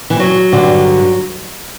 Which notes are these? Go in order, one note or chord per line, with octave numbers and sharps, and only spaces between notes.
E3
F#3
G2 D3